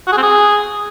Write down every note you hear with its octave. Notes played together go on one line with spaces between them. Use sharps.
F#4
G#4
C4
G#4